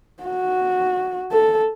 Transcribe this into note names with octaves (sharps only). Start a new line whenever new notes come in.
F#4
A4